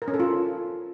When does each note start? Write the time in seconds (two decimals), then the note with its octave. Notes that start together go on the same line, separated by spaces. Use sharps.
0.02 A#4
0.08 C#4
0.14 A4
0.20 F4